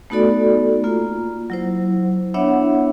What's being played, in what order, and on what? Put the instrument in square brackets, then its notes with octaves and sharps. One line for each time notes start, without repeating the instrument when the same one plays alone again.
[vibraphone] A3 B3 D#4 F#4 A4 D5
A#3 F4
F#3 E4 C5
B3 D4 E4 C#5 E5 F#5